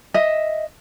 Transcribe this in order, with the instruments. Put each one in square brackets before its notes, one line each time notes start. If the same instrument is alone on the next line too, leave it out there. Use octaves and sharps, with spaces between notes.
[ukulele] D#5 E5